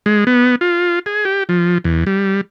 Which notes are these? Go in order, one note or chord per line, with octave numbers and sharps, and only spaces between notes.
G#3
B3
F4
G#4
G4
F3
E2
G3